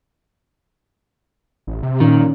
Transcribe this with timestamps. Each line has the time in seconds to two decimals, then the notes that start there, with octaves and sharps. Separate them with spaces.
1.67 A1
1.83 C3
2.00 A#2 D#3 C#4